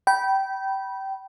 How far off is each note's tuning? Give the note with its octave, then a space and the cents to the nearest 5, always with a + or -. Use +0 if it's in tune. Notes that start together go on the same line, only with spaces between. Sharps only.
G5 -25 B5 -20